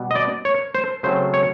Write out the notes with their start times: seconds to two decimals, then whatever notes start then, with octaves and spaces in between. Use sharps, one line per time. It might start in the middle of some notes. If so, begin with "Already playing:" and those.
Already playing: B2 G3 B3
0.11 D#5
0.15 D5
0.45 C#5
0.75 C5
1.03 C#3 F#3 A3 C4 C5
1.34 C#5